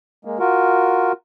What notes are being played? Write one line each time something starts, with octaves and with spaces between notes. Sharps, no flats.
G#3 A#3
F4 F#4 A#4